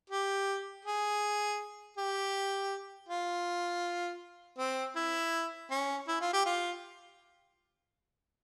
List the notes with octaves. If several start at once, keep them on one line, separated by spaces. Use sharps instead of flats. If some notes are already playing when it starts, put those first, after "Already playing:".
G4
G#4
G4
F4
C4
E4
C#4
E4
F4
G4
F4